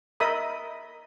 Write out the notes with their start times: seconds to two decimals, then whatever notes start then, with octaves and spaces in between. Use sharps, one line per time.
0.20 A#4 D#5 E5 B5 D#6